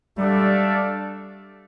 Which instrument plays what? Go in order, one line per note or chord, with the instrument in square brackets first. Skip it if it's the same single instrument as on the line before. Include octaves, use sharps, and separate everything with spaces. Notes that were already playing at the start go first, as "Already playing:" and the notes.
[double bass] G3 [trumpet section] A3 D4 A4 D5 F5